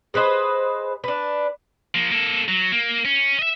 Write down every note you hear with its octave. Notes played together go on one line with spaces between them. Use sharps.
G#4 B4 C5 D#5
D4 B4
F3 A#3
A#3 A4
F#3
A#3
C#4
D#5 E5